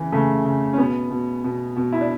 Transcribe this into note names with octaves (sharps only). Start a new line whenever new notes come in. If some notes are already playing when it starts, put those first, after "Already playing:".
Already playing: C#3 E3
C#3 A3
C#3
C#4
B2 B3
B2
B2
B2
E4
D4